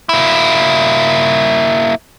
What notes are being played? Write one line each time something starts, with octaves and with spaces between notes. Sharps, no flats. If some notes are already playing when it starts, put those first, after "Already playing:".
A#3 E4